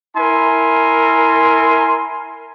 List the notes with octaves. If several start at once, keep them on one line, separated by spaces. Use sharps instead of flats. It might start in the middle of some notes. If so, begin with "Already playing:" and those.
E4 A#4 G#5 C6